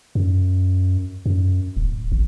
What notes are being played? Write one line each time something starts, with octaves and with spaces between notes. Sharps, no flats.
F#2
F#2
D1
G#1